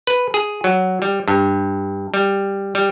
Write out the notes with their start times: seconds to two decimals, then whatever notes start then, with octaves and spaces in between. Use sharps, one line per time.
0.07 B4
0.34 G#4
0.64 F#3
1.02 G3
1.28 G2
2.14 G3
2.75 G3